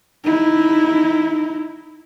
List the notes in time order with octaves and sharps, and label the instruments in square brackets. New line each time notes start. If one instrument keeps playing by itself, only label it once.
[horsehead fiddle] D#4 E4